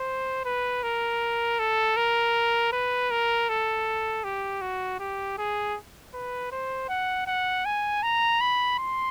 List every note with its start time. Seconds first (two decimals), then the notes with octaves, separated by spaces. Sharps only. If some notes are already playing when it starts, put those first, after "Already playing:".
Already playing: C5
0.45 B4
0.83 A#4
1.59 A4
1.97 A#4
2.73 B4
3.11 A#4
3.49 A4
4.24 G4
4.61 F#4
5.00 G4
5.38 G#4
6.14 B4
6.52 C5
6.89 F#5
7.27 F#5
7.65 G#5
8.03 A#5
8.41 B5
8.79 C6